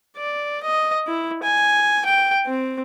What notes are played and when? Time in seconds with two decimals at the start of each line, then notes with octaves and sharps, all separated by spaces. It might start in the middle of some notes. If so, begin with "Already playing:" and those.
0.17 D5
0.63 D#5
1.07 E4
1.43 G#5
2.05 G5
2.46 C4